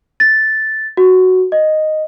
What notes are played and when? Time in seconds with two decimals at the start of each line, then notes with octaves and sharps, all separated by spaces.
0.20 A6
0.97 F#4
1.52 D#5